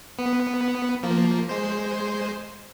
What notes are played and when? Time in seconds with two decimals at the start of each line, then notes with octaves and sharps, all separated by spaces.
0.19 B3
1.03 F3 A#3
1.49 G#3 C5